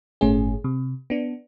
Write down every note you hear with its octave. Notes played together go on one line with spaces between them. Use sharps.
G1 A2 A3 C#4 G#4
C3
B3 D4